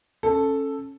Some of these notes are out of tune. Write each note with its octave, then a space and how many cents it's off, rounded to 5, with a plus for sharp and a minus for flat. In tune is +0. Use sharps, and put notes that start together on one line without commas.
C#4 -20 A4 +0